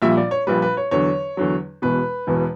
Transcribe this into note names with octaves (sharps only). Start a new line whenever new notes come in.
A#1 A#2 G3 E5
D5
C#5
A#1 A#2 G3 B4
B4
C#5
E2 D3 F#3 C#5
E2 D3 F#3
E1 E2 B2 B4
E1 E2 B2